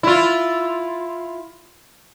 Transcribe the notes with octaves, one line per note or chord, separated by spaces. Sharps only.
E4 F4